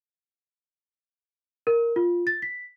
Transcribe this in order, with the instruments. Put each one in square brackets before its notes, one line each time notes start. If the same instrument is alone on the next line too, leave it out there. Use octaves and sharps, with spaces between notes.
[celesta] A#4
F4
A6
B6